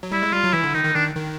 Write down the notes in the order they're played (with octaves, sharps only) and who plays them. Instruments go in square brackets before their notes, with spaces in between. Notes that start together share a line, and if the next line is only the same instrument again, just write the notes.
[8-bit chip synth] F#3
[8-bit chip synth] G3 [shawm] E4
[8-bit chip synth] G#3
[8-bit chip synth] G3 [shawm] F4
[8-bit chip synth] F#3
[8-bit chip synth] E3 [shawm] E4
[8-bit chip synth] D3
[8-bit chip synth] D#3 [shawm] D#4
[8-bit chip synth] D#3
[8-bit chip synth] D#3 [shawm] D4
[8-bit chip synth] D#3